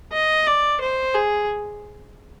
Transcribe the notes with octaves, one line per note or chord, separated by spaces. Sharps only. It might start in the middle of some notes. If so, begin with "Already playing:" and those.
D#5
D5
C5
G#4